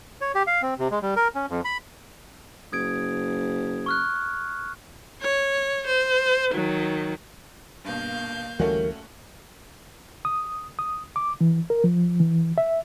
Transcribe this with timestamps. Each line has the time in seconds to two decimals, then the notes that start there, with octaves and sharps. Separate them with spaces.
0.21 C#5
0.35 G4
0.47 F5
0.62 C4
0.79 C3
0.91 G#3
1.02 G3
1.16 A#4
1.35 C#4
1.50 F2
1.65 B5
2.72 F#1 D#6 G#6 D7
3.86 C#6 F6 F#6
5.21 C#5
5.87 C5
6.52 D#3 F#3
7.85 G2 B2 A#3 F5 G6
8.59 D2 E3 G3 A3 C#4 F#4 A#4
10.25 D#6
10.79 D#6
11.16 D6
11.41 E3
11.70 A#4
11.84 F3
12.20 E3
12.58 E5